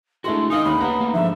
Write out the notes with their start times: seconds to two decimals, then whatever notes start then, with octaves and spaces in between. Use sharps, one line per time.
0.24 G#3 A3 D4 E4 F#4 C6
0.50 D#4 A#4 D#5 F5 G#5 D#6
0.65 D#2 D3 B5
0.80 A#3 G4 B4 F#5 A#5
1.01 A3 A#3
1.14 G#2 D3 F3 E5